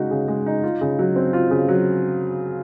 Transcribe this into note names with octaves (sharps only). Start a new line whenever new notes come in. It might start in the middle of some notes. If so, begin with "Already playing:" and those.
Already playing: C#3 G#3 D#4 F#4
C#3
G#3
D#4
F4
C#3
F#3
C4
F4
C#3
F#3